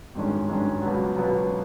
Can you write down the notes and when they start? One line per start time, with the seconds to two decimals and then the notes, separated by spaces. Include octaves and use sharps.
0.15 G#1 G2 D#3 G#3 C#4
0.49 G#1 G2 D#3 G#3 C#4
0.83 C#2 B2 F#3 B3
1.16 C#2 B2 F#3 B3